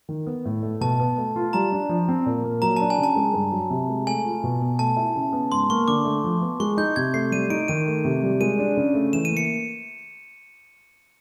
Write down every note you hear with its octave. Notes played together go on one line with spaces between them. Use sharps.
D#3
B3
A2
A3
B2 A5
B3
A3
F4
G3 A#5
D4
F3
C4
A#2
A#3
F#3 A#5
D4 A5
G#5
C#3
A5
G#3
G2
F#3
C3
G#3
A3 G#5
F4
B2
B3
A3 A5
E4
C#3
B3
G#2 C6
A#3 C#6
D3 D6
A3
F3
B3
G#3 C#6
D#4 G6
C3 G#6
A3 C7
G3 D#7
D#4 D7
D#3 D#7
A3
C3
G3
G#3 D#7
D4
C#3
A3
E3 E7
D#7
A#3
C#7